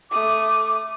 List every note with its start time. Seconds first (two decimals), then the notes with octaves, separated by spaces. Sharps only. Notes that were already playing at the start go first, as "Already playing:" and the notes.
0.11 A3 D6 D#6